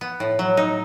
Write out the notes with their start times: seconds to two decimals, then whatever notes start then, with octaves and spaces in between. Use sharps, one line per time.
0.01 B3
0.20 A2
0.39 F#3
0.57 D#4